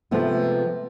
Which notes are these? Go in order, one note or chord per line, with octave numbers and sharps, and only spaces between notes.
C3 F3 G#3 A3 B3